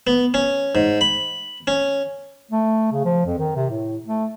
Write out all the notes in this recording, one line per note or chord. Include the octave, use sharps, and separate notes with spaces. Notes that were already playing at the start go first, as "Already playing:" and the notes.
B3
C#4
G#2
B5
C#4
A3
C#3
F3
F2
D#3
C3
A2
A3